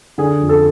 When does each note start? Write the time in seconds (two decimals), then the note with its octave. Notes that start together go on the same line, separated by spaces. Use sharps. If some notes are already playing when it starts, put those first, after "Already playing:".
0.18 D3 G#4
0.41 F2
0.49 A4